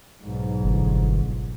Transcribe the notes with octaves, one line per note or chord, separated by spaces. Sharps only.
B1 G#2
G1